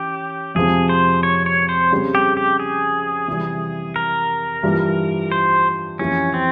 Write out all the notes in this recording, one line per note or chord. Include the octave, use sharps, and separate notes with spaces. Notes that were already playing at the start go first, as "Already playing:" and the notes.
Already playing: E3 C#4 G4
F2 C3 F3 G#3 C4 G#4
C5
C#5
C#5
C5
C#3 G3 C4
G4
G4
G#4
C3 E3 G3
A#4
G2 E3 G3 A#3 F4
C5
F2 E3 A#3 C#4 E4 G4
C4